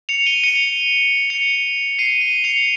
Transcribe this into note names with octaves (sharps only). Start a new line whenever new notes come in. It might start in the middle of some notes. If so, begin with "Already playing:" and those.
C#7 F7
D#7 G7
C#7 F7
C#7 F7
C7 D#7
D#7 G7
C#7 F7